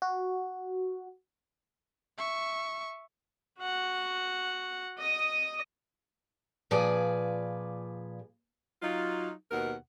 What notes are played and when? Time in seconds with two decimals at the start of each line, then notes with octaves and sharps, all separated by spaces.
0.02 F#4
2.18 E5 C#6
3.59 F#4 F#5
4.98 D#5 D#6
6.71 A#2 F3 G#4 B4 D5 G#5
8.82 F#3 D#4 F4
9.51 D#2 B2 A#4 F#5